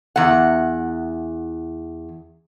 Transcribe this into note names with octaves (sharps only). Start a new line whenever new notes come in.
E2 F#5